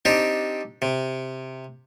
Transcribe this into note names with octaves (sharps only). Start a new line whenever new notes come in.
C4 D4 D#4 G4
C3